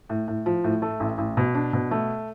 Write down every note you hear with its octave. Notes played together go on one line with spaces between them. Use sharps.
A2
A2
F3
A2
A3
A1
A1
B2
D4
B2
A3